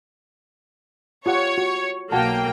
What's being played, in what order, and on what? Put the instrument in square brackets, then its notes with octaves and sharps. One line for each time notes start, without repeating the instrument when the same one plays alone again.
[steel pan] F4 G4 F#5 [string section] C#5
[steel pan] F#4
[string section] B1 A#3 G5 [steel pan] F#4 F#5 A5